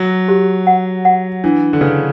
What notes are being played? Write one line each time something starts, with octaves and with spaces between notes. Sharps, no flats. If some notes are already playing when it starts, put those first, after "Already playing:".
Already playing: F#3
G4
F#5
F#5
E3 D4
D3
C#3 B4